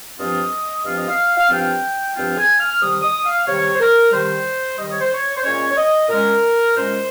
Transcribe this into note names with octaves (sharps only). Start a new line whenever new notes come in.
G2 F3 C4 F4 D#5
G2 F3 C4 F4 F5
D#5
F5
F5
G2 F3 C4 F4 G5
G2 F3 C4 F4 G5
G#5
F6
C3 D#3 G3 D#6
D#6
F5
C3 D#3 G3 C#5
C5
A#4
C3 D#3 G3 C5
C3 D#3 G3 D#5
C#5
C5
C#5
C5
A#2 G#3 C#4 C#5
C#5
D#5
A#2 G#3 C#4 A#4
A#2 G#3 C#4 C5